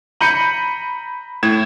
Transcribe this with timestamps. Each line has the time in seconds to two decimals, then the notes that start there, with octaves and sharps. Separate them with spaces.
0.21 A#5 B5 G6 C#7 D#7 F#7
1.43 A2 G#6 E7